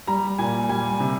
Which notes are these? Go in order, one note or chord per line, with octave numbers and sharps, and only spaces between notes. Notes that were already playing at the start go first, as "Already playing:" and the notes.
G3 A#5
A#2 G#5
G3 G#5
C3